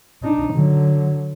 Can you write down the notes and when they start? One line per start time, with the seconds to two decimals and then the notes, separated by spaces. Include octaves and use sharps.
0.23 D4 D#4
0.54 D3 F#3